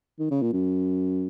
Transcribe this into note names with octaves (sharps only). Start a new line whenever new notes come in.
D#3
C#3
A#2
F#2